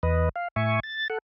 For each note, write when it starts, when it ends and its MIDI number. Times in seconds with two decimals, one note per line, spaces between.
0.03 0.29 40
0.03 0.29 71
0.03 0.29 75
0.36 0.48 77
0.56 0.80 45
0.56 0.80 76
0.56 0.80 80
0.56 0.80 85
0.83 1.08 93
1.10 1.18 69
1.10 1.18 78